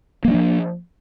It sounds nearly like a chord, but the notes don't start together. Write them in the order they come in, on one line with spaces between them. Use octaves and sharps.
A#3 F#3 D4 F3